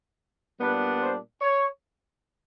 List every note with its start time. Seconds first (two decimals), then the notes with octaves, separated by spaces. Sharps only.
0.60 A#2 G3 B3 D4 B4
1.01 C5
1.41 C#5